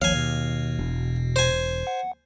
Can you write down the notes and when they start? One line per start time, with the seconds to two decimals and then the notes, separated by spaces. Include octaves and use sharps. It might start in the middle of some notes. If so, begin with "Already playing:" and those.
0.02 G#1 D#2 F3 C#5 F5 G#5
0.15 B2
0.79 E1
1.36 C5 G#5
1.87 F#5